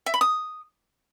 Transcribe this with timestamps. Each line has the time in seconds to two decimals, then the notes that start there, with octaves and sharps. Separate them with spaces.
0.06 E5
0.14 B5
0.21 D#6